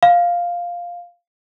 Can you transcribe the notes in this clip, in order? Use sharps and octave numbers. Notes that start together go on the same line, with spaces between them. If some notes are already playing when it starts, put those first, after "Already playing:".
F5